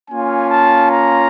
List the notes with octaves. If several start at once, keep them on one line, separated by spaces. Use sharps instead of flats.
A#3 C#4 F4 G#5
A5
A#5